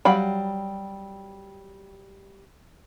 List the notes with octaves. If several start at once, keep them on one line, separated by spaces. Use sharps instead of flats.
F#3 G3 F5 G5 B5